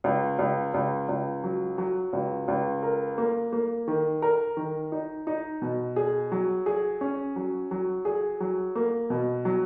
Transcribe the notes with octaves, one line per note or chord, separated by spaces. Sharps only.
C#2
C#2
C#2
C#2
F#3
F#3
C#2
C#2
A#4
A#3
A#3
D#3
A#4
D#3
D#4
D#4
B2
G#4
F#3
G#4
C#4
F#3
F#3
G#4
F#3
A#3
B2
F#3